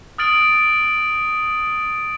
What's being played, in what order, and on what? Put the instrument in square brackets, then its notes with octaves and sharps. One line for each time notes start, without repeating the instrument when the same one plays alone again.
[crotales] D#6 F6 A6 D7 F#7